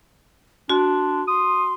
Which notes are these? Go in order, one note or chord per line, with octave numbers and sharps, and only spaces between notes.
D4 F#4 C6
C6 D#6